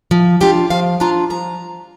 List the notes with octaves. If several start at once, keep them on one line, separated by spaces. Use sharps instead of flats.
F3
D4 F4 G4
F3 F5
D4 F4 A#5
F3 A#5